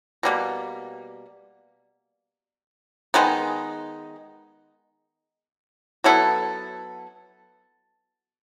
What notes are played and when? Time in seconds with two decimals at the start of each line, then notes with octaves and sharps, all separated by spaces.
0.23 B2 G3 A#3
3.14 D#3 G#3 B3 D#4
6.04 F#3 B3 E4 A4